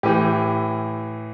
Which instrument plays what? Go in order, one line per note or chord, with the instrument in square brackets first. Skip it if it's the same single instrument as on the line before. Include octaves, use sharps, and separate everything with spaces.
[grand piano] A2 E3 G4